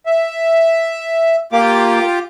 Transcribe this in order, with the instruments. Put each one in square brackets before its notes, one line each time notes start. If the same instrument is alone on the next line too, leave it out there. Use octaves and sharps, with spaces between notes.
[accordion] E5
[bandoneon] A#3 [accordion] F4 G4 D6